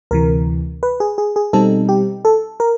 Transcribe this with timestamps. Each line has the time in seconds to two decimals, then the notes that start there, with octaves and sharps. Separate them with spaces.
0.11 D2 C3 E3 A#4
0.83 B4
1.00 G#4
1.18 G#4
1.36 G#4
1.53 B2 G3 C4 D#4 A4
1.89 G4
2.25 A4
2.60 A#4